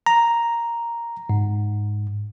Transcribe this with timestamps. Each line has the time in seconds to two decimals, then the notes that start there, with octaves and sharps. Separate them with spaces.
0.06 A#5
1.29 G#2